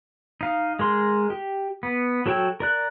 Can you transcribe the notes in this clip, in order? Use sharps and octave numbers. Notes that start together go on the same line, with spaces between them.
D#4 F5
G#3 A#4 C6
G4
B3
F#3 A4 C#5 G5 E6
A#4 D5 F#6